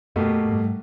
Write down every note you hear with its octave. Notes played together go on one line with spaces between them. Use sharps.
F#2 B2 A3 A#3 G4
G#2 G3